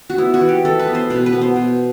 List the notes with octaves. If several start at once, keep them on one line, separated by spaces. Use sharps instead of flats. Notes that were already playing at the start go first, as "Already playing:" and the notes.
F#4
B3 E4
F#4
E3
G4
E3 A4
B4
B3
C5
B2 B4
B4
B3
C5
B2